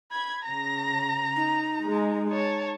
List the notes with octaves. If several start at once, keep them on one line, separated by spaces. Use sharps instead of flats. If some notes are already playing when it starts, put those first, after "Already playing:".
B5 G#6
C#3 A#5 A#6
D#4
G#3
C#5 A5